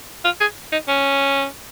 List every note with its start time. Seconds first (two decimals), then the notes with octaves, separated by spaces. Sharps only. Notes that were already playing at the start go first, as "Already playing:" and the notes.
0.25 F4
0.41 G#4
0.72 D#4
0.88 C#4